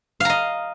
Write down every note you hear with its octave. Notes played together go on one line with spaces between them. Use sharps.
D#5 F5 A#5